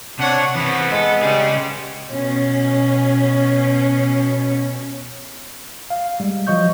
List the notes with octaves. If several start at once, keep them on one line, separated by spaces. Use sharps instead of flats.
C3 D4 C#5 F#5
E3 B3 C4
G#3 A4
C#3 G3 G#4
B2 C#4
F5
G3 G#3
F3 F#3 D#5 C#6 G6